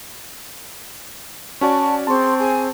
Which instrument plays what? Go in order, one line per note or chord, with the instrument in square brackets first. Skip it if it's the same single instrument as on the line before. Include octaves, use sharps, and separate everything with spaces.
[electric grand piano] C#4 F#4 D5 [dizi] A5 [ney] C#6
[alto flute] C4 [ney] G#4 [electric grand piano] A5 C#6 [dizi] C6
[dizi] G#4 [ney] G#5